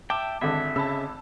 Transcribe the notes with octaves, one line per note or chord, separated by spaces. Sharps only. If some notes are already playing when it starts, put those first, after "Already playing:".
E5 G5 A5 D6
G#1 D3 E5
C#3 A5 B5 E6